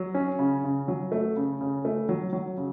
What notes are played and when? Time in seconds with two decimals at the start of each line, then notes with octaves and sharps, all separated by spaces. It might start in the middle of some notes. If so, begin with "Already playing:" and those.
Already playing: F#3
0.14 C#4
0.39 C#3
0.64 C#3
0.88 F#3
1.12 A3
1.36 C#3
1.61 C#3
1.85 A3
2.09 F#3
2.33 F#3
2.57 C#3